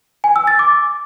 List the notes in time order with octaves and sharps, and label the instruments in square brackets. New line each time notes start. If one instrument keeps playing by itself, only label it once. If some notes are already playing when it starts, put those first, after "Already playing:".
[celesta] G#5
E6
A6
D6